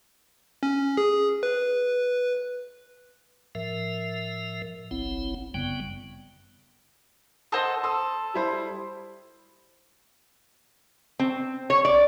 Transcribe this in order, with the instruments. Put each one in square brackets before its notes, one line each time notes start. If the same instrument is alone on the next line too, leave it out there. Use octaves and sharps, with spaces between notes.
[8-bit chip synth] C#4
G#4
B4
[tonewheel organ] A2 F3 A#4 E5
F#1 B1 C4 E4
G1 F#2 C#3 G3 B3 G5
[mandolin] A4 C5 D#5 [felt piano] F#5 A5 D#6
[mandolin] A4 [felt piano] C6 D#6 E6
[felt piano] G3 E4 C5
[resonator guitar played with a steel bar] C4
C#5
D5